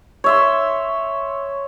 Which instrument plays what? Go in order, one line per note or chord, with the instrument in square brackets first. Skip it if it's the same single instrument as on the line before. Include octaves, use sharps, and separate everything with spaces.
[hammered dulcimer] C#5 E5 C6